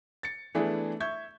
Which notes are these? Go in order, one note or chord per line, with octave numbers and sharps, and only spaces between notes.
A6 C#7
E3 A3 B3 D4 E4 G#4
E5 C#6 G6 G#6